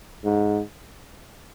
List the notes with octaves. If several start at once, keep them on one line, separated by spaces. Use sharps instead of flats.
G#2